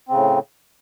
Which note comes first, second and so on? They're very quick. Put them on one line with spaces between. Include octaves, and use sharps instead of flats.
C4 C#3 A2